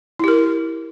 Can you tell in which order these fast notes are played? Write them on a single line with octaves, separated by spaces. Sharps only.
E4 G4 A#4